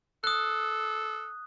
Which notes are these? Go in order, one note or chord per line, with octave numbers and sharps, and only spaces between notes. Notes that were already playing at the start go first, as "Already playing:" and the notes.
A4 D#6 F#6